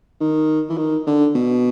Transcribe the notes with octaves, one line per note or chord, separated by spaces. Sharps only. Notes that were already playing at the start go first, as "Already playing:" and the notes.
D#3
E3
D#3
D3
B2